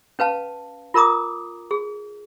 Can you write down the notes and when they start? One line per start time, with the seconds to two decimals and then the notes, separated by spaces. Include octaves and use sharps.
0.19 C#4 B4 F5 A5
0.94 F4 A#4 A#5 D6 D#6
1.71 G#4